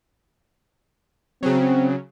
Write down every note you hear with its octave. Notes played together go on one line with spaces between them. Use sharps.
C#3 F#3 C4